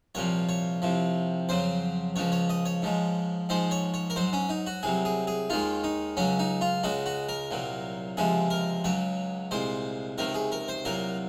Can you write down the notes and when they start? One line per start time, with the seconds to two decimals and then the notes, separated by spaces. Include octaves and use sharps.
0.15 C2 A#2 F3 C#5
0.49 C#5
0.82 C2 C3 F3
1.49 F2 C#3 F#3 C5
2.16 C#2 C#3 F3 C#5
2.32 C#5
2.49 D#5
2.66 C#5
2.82 G#2 F3 G#3
3.49 G#2 F3 G#3 C5
3.71 C#5
3.94 C#5
4.10 A#4
4.16 G#2 F#3 C5
4.33 C#4
4.49 D#4
4.67 F#4
4.83 C2 C3 F#3 G#4
5.05 G#4
5.27 G#4
5.50 D#2 D#3 G#3 F4
5.84 D#4
6.17 C#2 C#3 F#3 C#4
6.39 D#4
6.61 F4
6.83 C#2 C#3 G#3 F#4
7.06 F#4
7.29 A#4
7.51 C2 A#2 F#3
8.17 C#2 C3 F3 G#3 G#4
8.50 A#4
8.84 C#2 C#3 F#3 C#5
9.51 C2 A#2 G#3 C5
10.18 C#2 C3 D#3 A#4
10.34 G#4
10.52 A#4
10.68 C5
10.85 C2 A#2 F#3 A#4